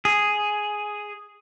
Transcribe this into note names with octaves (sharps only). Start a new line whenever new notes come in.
G#4